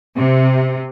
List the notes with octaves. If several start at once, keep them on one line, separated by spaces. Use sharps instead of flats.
C3